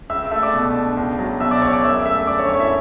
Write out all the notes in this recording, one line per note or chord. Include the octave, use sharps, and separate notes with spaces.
C#2 E5 E6
A3 E5 E6
D5 D6
B2
D4
C#2
F#3
B2 E5 E6
D5 D6
C#2 C#5 C#6
D5 D6
F#2 E5 E6
A3 E5 E6
D3 D5 D6
C#5 C#6
F#2 C#5 C#6
E4 E5